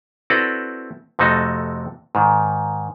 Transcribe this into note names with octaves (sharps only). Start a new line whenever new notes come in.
C4 E4 F#4 A4 B4 D5
F2 C3 A3 D#4 F#4 A4
G#2 D#3